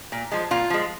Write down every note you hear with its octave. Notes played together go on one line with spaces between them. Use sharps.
A#2
F3 G#3
A#2 F4
F3 G#3